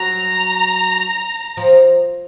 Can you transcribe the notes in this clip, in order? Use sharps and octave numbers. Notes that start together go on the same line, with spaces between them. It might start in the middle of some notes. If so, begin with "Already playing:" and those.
Already playing: F#3 A#5
F3